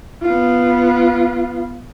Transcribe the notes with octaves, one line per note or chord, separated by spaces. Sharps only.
B3 F4